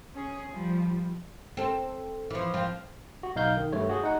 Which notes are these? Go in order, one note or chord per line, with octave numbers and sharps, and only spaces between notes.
C#4 G#4
F3 G3
C4 A4
E3 F3
F3 C4 F4
F#4
B1 D#4 F5 G6
D#3
G2 A3 C#5
F#4 G#4
D#4 F#5